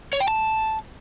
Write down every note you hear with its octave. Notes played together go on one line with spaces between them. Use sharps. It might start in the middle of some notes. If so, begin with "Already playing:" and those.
C#5
G5
A5